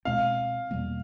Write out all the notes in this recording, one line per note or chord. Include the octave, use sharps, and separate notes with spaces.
B2 G#3 C4 F5
E2 B2 G3 A#3